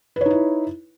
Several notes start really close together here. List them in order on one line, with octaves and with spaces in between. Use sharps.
B4 C#5 D#4 E4